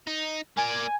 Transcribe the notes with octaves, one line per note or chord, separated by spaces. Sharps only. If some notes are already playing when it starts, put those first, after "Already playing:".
D#4
A#3 D5 G#5